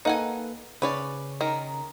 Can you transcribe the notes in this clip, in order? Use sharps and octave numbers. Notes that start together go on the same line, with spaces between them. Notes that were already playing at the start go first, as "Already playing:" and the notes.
A#3 D#4 A4 B4 F#5 G#5
C#3 C#4 B4 C#5 D5
D#3 A#4